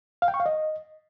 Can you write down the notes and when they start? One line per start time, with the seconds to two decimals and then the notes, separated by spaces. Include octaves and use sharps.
0.22 F5
0.28 G5
0.34 C#6
0.40 F5
0.46 D#5